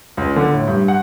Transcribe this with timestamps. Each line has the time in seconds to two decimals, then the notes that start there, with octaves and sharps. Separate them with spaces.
0.17 C#2
0.36 D3
0.53 A2
0.67 G2
0.88 F#5